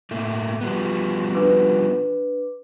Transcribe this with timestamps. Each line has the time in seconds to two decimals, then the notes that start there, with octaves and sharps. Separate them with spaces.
0.11 A2 A3 A#3
0.61 F3 G3 B3
1.34 D4 B4 D6